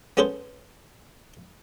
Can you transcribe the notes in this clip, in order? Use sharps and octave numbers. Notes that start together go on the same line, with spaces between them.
B3 C#4 G#4 A4 B4 C5